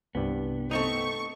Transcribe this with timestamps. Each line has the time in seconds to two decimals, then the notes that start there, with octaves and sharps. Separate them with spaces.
0.15 C2 G2 B3
0.71 A3 C4 D#4 C#6